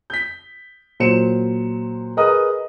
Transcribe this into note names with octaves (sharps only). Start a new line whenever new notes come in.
G6 B6
A#2 F#3 C5 C#7 E7
G#4 A#4 B4 D#5 D#6